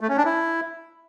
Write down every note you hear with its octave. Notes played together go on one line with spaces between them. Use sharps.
A3
C#4
D4
E4